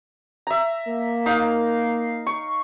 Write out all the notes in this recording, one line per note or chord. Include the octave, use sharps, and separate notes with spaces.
E5 A#5
A#3
D#4 F5
C#6